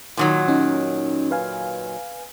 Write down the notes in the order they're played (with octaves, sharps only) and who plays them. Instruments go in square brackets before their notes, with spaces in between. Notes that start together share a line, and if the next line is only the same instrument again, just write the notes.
[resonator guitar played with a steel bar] A#2 D#3 F#3
[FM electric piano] C#4 D#4
B4 F5 G#5